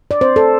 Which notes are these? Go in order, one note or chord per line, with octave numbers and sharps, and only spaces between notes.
D5
C4 C5
A4